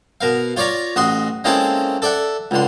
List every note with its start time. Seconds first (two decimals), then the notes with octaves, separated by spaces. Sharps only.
0.21 B2 A#4 F5
0.57 F4 C#5 D5 F5 A#5
0.96 A1 F#4 D#5 C6
1.44 G#3 A#3 C4 C#4 E4 A4
2.02 A4 D5 E5 F#5
2.51 C#2 D3 C6